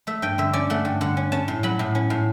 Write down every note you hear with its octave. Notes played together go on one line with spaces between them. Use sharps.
A3 E5
G2 G5
D3 E5
C#4 D5
A3 F#5
G2
D3 F#5
C#4
C#4 A5
A2
F#3 B5
A2
C#4
A2